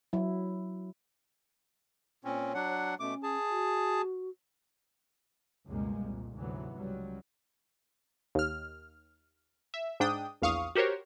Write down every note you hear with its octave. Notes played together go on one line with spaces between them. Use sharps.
F#3 E4
A#2 C4 C#4 C#5
F#3 D4 F#5
B2 A3 C#4 D6
G#4 A5
F#4
C#2 F#2 B2 G3 G#3 A#3
C2 F2 A#2
D2 G#2 C3 E3 F#3 B3
C#2 F#3 G3
D#2 F6
E5
G#2 D4 G5 D#6
A#1 E2 F5 C#6 D#6
F#4 G4 A#4 C5 C#5